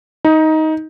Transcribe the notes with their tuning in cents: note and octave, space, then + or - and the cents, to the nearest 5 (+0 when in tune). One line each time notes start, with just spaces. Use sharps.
D#4 +15